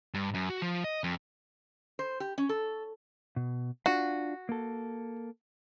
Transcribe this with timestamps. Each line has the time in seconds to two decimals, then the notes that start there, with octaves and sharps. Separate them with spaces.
0.14 G2
0.34 F#2
0.50 F#4
0.62 F3
0.84 D#5
1.04 F2
1.99 C5
2.20 G4
2.38 C#4
2.49 A4
3.36 B2
3.86 D4 F4 F#4
4.49 A#3 A4